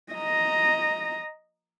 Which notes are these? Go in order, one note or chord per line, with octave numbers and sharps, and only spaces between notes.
D#5 A#5